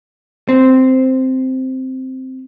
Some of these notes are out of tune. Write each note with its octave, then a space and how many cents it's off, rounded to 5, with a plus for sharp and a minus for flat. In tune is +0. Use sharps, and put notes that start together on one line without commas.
C4 -5